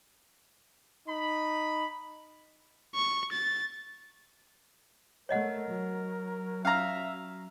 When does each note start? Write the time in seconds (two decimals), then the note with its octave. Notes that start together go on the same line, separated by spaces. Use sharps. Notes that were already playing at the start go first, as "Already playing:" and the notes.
1.08 D#4 B5
2.95 C#6
3.32 A6
5.29 A3 A#4 C#5 D#5 F#5
5.69 F#3
6.65 C#4 E5 F5 A#5